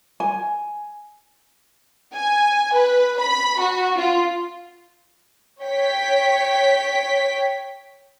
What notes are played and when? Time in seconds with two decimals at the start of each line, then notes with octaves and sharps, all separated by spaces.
0.20 G#5
2.15 G#5
2.75 B4
3.20 B5
3.61 F#4
3.98 F4
5.61 C#5 G5 B6